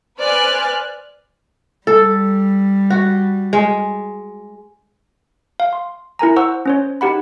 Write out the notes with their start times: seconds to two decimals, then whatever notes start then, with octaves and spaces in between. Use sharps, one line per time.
0.19 B4 C5 D5 G#5 F6 F#6
1.87 G3 A4
2.90 F#4
3.53 G#3
5.60 F5
5.73 C6
6.19 E4 A#4 G#5 A#5
6.36 C5 F#5 C#6 E6
6.66 C#4 C5 C#5
7.01 D#4 G4 F#5 B5